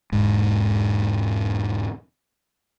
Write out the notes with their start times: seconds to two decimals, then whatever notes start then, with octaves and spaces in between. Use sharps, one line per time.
0.12 E1 G#2